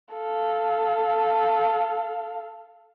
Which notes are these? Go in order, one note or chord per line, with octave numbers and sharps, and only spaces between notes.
A4 F5